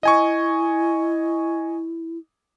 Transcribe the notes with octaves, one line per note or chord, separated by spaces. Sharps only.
E4 D#5 G#5 C#6